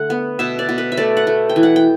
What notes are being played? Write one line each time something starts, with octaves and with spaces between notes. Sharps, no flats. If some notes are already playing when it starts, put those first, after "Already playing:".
Already playing: D3 A3 F#5
B3
B2 E5
D5
B2
B4
E5
A3 D5
F#5
A3
G5
E3
F#5
G5